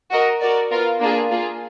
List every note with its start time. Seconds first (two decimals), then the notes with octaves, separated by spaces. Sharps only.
0.11 F#4 A#4 D#5
0.41 F#4 A#4 D5
0.71 B3 F4 A#4 F5
1.01 A#3 D4 F4 G#4
1.30 A#3 F4 G#4